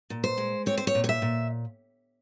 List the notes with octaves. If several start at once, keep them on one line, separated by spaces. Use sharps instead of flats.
A#2
C5
G#3
C4 C#5
C5
C#5
A#2
C#5
E5
A#2